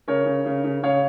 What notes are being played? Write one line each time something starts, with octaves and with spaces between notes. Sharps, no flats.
C#3 A#4 C#5
C#3
C#3
C#3
C#3 C#5 F5